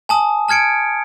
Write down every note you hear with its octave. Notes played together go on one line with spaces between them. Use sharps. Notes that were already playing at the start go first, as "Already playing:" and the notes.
G#5 A5 D#6
A5 F6 G#6 C#7 D7